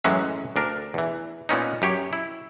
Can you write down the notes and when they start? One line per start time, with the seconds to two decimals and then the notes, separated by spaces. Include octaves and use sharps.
0.04 F#2 A2 E3 F#3 G#3 C#4
0.56 D2 D4 A#4
0.94 E2 E3
1.49 A#2 B3 C#4 D#4
1.82 F#2 G4 C#5
2.13 E4